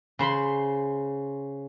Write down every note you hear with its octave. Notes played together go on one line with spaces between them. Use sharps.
C#3 C5 B5 C6